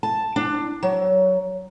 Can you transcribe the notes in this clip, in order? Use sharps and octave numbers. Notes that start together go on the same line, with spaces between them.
A5
D4
F#3